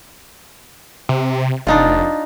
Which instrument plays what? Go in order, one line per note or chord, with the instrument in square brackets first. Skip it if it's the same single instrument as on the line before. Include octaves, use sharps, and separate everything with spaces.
[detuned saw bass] C3
[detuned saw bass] F1 [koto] D4 D#4 F4